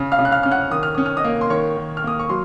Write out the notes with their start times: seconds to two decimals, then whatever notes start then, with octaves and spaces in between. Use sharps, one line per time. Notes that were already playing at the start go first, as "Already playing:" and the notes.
Already playing: C#3
0.12 F5 F6
0.19 C#3
0.25 F#6
0.31 F5 F6
0.43 C#4 F6
0.51 F#5 F#6
0.71 D#3 D#6
0.83 F6
0.95 C#4 D#6
1.06 F6
1.17 D#5 D#6
1.24 A#3
1.41 C6
1.50 D#3 C#5 C#6
1.77 D#3
1.97 F6
2.04 A#3 D#6
2.19 C#6
2.29 F#3 C6